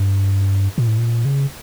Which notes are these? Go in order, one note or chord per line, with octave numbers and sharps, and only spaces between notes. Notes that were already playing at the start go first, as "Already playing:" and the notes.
Already playing: G2
A#2
A2
A#2
C#3